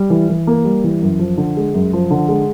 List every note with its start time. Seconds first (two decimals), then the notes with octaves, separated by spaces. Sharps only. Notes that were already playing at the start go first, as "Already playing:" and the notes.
Already playing: G3
0.10 E3
0.29 E3
0.47 A#3
0.65 G3
0.84 E3
1.02 F#2
1.19 F3
1.37 D3
1.57 G#3
1.74 F#2
1.93 F3
2.10 D3
2.29 G#3